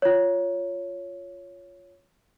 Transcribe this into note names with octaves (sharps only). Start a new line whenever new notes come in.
F4 C#5